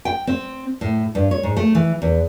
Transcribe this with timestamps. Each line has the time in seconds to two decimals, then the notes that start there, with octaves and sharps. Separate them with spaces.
0.05 G5
0.27 C4
0.81 A2
1.15 G2
1.31 C#5
1.43 G#2
1.57 A3
1.75 E3
2.02 E2